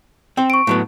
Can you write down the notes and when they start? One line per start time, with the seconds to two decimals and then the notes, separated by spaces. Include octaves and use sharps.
0.37 C4 C5 G5
0.50 C#6 D7
0.67 A2 F#3 B3